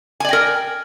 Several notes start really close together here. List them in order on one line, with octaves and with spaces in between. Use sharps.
G#5 D5 G5 A#4